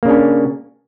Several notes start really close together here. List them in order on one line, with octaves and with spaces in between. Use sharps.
A#3 C#3 D4 C#4